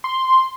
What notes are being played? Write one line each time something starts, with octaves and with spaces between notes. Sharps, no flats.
C6